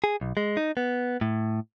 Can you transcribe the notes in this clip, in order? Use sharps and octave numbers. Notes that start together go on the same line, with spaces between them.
G#4
B1
G#3
D#4
B3
A2